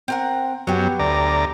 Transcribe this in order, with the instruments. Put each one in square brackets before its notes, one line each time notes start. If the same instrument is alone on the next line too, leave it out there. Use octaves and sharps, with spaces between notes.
[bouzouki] C4 A#4 F#5
[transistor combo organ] F#2 F#3 [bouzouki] B3 G4
[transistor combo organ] D2 D5 A#5